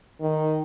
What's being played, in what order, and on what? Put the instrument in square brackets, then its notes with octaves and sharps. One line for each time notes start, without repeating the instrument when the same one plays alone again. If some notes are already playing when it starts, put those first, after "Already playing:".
[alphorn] D#3